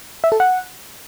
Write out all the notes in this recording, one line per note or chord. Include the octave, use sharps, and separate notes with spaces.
E5
A4
F#5